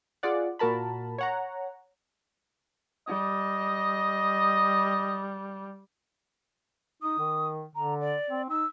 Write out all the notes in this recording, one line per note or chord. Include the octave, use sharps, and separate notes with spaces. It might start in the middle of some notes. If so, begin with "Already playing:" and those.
F4 G#4 D5 F#5
A#2 F#4 A#4 A5 B5
C#5 F#5 A#5
G3 D#5
D#4 D#6
D#3
D3 A#5
D5
C4
D#4 E6